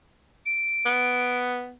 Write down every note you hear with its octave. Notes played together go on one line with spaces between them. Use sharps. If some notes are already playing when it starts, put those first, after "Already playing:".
D7
B3